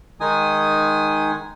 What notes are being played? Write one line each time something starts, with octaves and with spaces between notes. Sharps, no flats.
D#3 G#3 D#4 G#5 D#6